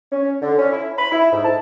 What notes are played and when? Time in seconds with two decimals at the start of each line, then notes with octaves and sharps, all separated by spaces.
0.12 C#4
0.42 D3
0.57 C#4
0.72 E4
0.98 B5
1.12 E4
1.33 G#2
1.45 A5